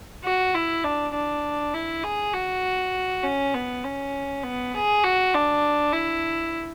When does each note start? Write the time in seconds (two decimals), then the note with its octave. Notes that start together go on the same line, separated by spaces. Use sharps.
0.24 F#4
0.54 E4
0.84 D4
1.14 D4
1.74 E4
2.04 G#4
2.33 F#4
3.23 C#4
3.54 B3
3.84 C#4
4.43 B3
4.74 G#4
5.04 F#4
5.34 D4
5.93 E4